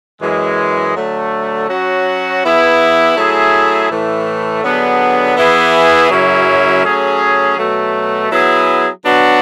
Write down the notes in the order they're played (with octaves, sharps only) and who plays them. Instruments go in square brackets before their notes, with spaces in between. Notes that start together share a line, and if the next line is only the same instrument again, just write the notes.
[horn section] F#2 E3 G#3
D3 F#3 A3
F#3 C#4 F#4
E3 B3 E4 G#4
F#3 A3 E4 G#4
A2 E3 A3
D3 F#3 B3 D4 G#4
E3 B3 E4 G#4
F#2 C#3 F#3 C#4 E4
F#3 A3 C#4 G#4
B2 F#3 A3
F#3 B3 E4 G#4
F#3 B3 D4 F#4